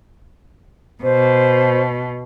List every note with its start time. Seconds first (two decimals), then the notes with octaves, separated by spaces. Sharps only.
1.03 B2 C5